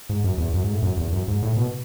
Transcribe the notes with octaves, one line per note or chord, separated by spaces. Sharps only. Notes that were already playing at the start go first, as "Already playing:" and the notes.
G#2
F#2
E2
F#2
G#2
A2
F#2
E2
F#2
G#2
A2
B2